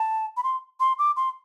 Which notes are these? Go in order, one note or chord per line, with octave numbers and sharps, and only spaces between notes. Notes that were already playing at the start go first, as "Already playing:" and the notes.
Already playing: A5
B5
C6
C6
D6
C6